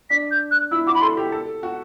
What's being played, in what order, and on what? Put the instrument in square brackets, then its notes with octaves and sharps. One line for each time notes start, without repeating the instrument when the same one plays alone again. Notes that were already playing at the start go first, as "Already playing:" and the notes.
[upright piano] D4 [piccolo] B6
[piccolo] G6
F#6
[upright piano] E4 [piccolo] E6
[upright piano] F#4 [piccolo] D6
[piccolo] B5
[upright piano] A4 [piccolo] C6
[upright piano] G4
A4
F#4